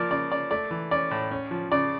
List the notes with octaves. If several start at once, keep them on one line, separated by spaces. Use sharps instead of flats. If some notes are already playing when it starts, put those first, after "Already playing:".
Already playing: F3 A#3 A#4 D5
C#3 D5
C#3 D5
A3 D5
E3
C#4 D5
A2
C#4
F3
C#3 D5